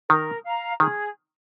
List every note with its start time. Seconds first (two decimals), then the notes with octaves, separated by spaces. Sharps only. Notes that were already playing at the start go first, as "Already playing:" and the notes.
0.10 D#3 A#4
0.45 F5 A#5
0.80 D#3 G#4